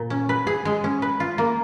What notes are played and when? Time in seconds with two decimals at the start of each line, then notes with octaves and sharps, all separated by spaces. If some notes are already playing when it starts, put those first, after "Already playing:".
Already playing: A#2
0.10 C#4
0.29 B4
0.47 G#4
0.65 G#3
0.84 C#4
1.02 B4
1.20 F4
1.38 A#3